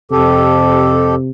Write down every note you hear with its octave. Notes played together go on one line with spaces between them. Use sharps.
F2 C3 G4 A4